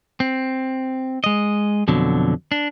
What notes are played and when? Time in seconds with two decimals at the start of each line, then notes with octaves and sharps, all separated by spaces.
0.20 C4
1.24 G#3 D#5
1.88 F2 B2 D3 F#3
2.52 D4